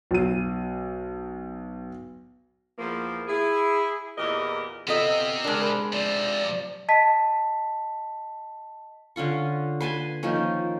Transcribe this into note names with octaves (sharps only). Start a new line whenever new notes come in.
B1 D#7
E2 F3 A#3
E4 G#4
E2 A#2 E3 G4 A#4 D#5
C3 B3 C4 F4 A4 D#5
G#3 D4 A#4
B5
C3 F3 D5
D#5 A5 B6
D3 C#4 F4 C#6
B4 G#5 A5 C6
D#3 F3 A#3 C#4